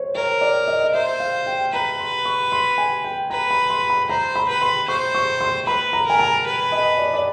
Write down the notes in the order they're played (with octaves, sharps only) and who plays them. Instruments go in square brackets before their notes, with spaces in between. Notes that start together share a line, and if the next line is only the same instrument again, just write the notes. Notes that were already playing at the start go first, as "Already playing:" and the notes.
Already playing: [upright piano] C5 C#5
[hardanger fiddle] A#4 [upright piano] C#5
[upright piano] D5
D#5
D#5
[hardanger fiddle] C5 [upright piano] E5
[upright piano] F5
G5
[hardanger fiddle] B4 [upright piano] A#5
[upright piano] C6
C#6
C6
G#5
G5
[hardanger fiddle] B4 [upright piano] A#5
[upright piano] B5
C6
B5
[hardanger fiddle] C5 [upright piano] A#5
[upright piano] B5
[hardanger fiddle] B4
[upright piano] C6
[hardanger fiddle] C5 [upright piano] C#6
[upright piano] C#6
C6
[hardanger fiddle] B4 [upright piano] B5
[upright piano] A#5
[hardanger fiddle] A#4 [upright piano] G#5
[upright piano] A5
[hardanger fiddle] B4
[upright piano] D#5
D5
D5